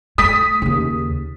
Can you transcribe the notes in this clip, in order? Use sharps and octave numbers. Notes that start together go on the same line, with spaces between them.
A3 D#6 B6
D#2 C#3